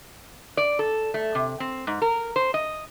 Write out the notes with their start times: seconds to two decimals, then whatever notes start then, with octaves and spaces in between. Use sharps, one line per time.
0.57 D5
0.79 A4
1.14 A3
1.35 C3
1.60 C4
1.87 G#2
2.02 A#4
2.36 C5
2.54 D#5